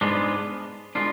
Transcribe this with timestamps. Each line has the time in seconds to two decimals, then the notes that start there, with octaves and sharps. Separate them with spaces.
0.01 G#2 G#3 B3 D4 F4
0.95 G#3 B3 D4 F4